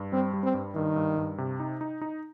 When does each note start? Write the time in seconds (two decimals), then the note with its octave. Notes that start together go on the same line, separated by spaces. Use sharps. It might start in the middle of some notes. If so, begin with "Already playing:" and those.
Already playing: G2
0.12 G3 C4
0.33 G3
0.43 C4
0.54 G2
0.75 G2 D#3
0.96 G2
1.17 G2
1.38 C3
1.60 D#4
1.81 D#4
2.01 D#4